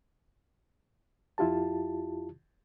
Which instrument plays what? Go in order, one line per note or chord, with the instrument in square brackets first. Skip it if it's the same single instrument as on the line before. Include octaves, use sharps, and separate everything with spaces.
[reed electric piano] F2 E4 F4 G4 A5